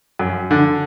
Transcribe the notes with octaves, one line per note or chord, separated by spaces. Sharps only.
F#2
D3